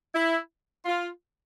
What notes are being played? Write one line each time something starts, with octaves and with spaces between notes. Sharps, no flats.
E4
F4